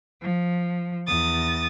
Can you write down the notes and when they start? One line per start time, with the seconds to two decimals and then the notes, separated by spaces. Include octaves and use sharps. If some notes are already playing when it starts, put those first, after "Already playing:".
0.21 F3
1.07 E2 D#6 A6